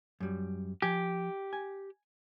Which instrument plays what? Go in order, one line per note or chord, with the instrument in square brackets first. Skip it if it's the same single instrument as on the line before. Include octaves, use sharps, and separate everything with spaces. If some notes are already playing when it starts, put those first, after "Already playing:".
[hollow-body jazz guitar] F#2 G3
[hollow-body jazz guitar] F3 G#5 [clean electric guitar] G4
[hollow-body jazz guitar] G#5